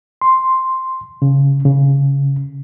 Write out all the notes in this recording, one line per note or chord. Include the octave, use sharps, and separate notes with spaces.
C6
C#3
C#3